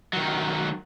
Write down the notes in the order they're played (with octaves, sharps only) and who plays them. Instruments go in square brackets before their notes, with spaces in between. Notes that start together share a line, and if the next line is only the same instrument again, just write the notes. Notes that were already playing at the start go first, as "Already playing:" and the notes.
[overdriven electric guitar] D#3 F#3